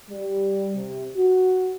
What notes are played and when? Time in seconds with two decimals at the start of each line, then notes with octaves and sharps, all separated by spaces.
0.10 G3
0.76 C3
1.17 F#4